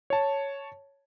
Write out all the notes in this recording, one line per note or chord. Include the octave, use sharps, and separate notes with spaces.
C#5 A5